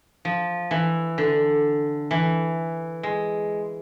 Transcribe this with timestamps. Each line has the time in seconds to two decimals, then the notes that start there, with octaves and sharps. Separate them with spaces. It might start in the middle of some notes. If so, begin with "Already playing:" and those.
0.25 F3
0.71 E3
1.18 D3
2.11 E3
3.03 G#3